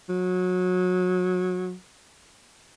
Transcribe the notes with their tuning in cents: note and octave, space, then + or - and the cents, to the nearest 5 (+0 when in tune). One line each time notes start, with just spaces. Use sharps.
F#3 -25